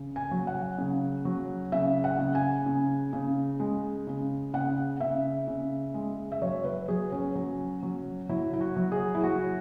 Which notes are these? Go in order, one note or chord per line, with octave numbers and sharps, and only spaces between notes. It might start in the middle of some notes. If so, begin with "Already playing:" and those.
Already playing: C#3
G#5
F#3
F#5
C#3
F#3
C#3 E5
F#5
C#3
G#5
C#3
C#3
G#3
C#3
C#3 F#5
C#3 E5
C#3
G#3
E5
F#3 C#5
B4
F#3 G#4
C#4
F#3
F#3
F#3 E4
E4
F#4
F#3
G#4
E4
F#3 F#4